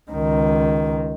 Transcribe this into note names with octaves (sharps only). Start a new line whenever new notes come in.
C#2 D#3